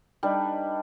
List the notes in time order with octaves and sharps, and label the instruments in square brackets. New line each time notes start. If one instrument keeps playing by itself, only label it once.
[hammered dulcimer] G3 D4 D#4 B4